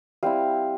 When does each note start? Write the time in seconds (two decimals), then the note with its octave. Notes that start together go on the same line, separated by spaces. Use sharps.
0.23 G3 C4 E4 F5